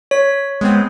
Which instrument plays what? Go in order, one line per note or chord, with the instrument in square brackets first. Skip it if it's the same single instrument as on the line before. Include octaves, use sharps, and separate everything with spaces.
[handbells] C#5 [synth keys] B6
[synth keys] G#3 B3 C4